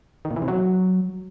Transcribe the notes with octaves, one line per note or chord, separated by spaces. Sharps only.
D#3
A#2
E3
C3
F#3